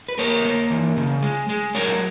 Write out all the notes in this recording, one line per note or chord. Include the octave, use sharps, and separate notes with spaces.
B4
A#3 A#4 C#5
A#3
E3
C#3
G#3
G#3
F#3 A#4 C#5